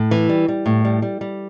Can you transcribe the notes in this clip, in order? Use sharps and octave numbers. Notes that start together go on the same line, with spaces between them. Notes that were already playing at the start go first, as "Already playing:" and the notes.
Already playing: A2
E3
G3
G3
A2
G3
G3
G3